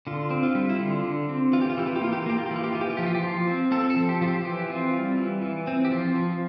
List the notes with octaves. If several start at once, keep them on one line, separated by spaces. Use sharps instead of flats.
D3 F4
C4
F4
G3
E4
D3 F4
D3
C4
E3 F4
G4
F4
E3 G4
F4
G4
A#3 F4
G4
F4
A#3 G4
F4
G4
E3 F4
G4
E3 F4
G4
F4
F3 G4
F4
G4
F3 F4
C4
C4 A4
A4
F3
G4
F3 F4
G4
E3 G4
C4 F4
G3 F4
E3
E3
C4
G4
F3 F4
F3